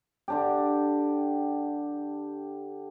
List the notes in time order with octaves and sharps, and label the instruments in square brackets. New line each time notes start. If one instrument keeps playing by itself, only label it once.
[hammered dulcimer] D3 D4 G4